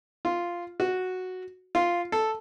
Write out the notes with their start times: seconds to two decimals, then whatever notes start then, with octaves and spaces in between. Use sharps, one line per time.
0.25 F4
0.80 F#4
1.75 F4
2.12 A4